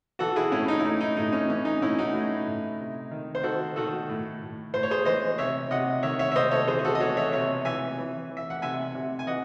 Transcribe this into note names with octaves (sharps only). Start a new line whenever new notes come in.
E3 F#4 A4
E4 G#4
A2 C#4 E4
D#4
E4
A2 D#4
D#4
A2 D#4
C#4
E3 C#4
D#4
A2 C#4 E4
D#4 F#4
A2
A2
C3
D#3
C5
D#3 F#4 A4
D#3 F#4 A4
A2
A2
A2 C5
C#5
G#4 C5
E3 C5 D#5
C3 C#5 E5
C3 D#5 F#5
D#3 C#5 E5
C#5 E5
E5
C3 C5 D#5
A4 C#5
E3 G#4 C5
G#4
F#4 A4
D#5
E3 A4 C#5
C#5 E5
C3 C#5 E5
E3 E5 G#5
E3
E3
E5
F#5
C3 E5 G#5
C3
G#5
E3 D#5 F#5